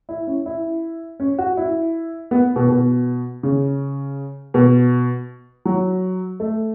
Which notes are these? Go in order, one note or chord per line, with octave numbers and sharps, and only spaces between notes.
E4
C#4
E4
C#4
F#4
E4
B3
B2
B2
C#3
B2
F#3
A3